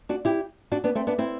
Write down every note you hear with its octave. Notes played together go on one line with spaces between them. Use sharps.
D4 F#4
E4 G4
D4 F#4
B3 D4
A3 C4
B3 D4
C4 E4